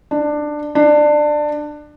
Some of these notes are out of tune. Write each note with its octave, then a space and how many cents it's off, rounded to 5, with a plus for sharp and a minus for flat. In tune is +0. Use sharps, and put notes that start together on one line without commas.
D4 +15
D4 +20